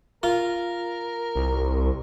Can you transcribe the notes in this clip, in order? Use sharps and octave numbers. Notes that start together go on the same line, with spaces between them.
F4 A#4
C2